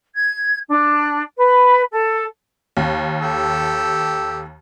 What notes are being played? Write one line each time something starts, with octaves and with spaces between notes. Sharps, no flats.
G#6
D4
B4
A4
D#2
G4 A4 E6